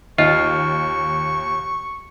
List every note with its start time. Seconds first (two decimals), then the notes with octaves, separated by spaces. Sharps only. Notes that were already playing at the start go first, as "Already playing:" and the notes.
0.18 D#2 F4 D#5 C#6